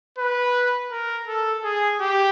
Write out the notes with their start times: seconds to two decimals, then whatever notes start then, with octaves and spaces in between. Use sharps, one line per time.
0.18 B4
0.91 A#4
1.28 A4
1.64 G#4
2.00 G4